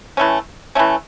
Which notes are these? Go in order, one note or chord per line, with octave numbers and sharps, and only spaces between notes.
E3 A3 C#4
E3 A3 C#4